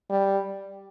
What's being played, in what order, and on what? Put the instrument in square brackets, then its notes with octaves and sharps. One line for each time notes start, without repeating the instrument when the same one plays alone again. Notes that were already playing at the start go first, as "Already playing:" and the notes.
[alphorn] G3